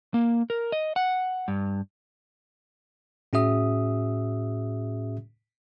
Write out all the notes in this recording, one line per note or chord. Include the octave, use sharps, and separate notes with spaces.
A#3
A#4
D#5
F#5
G2
A2 C#4 F#4 G#4 E5 D#6